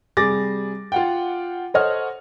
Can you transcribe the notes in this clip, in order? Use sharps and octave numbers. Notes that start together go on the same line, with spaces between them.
C3 G3 G#4 D6 A6 A#6
F4 F#5 G5
A4 C5 C#5 D#5 F#5 F6